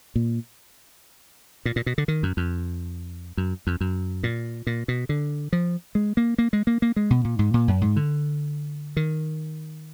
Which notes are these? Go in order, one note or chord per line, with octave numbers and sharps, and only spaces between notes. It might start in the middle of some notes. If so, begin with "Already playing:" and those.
A#2
A#2
A#2
B2
D3
D#3
F#2
F2
F#2
F2
F#2
A#2
A#2
B2
D3
F3
G#3
A#3
A#3
G#3
A#3
A#3
G#3
B2
A#2
G#2
A#2
F#2
G#2
D3
D#3